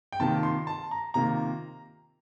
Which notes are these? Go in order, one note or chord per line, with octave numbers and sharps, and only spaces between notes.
G5
C3 D#3 A#3 F4 A5
C6
A5
A#5
C3 D#3 A#3 F4 A#5